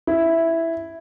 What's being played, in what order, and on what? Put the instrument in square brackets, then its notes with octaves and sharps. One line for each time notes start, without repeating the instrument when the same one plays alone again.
[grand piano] E4